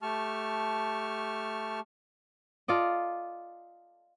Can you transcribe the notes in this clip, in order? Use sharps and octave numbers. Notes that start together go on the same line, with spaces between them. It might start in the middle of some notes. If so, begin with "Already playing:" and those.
A3 G4 A5 C#6 F6
F4 A4 D5 D#5